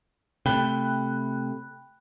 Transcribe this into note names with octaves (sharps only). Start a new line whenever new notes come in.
C3 A3 G5 B5 F#6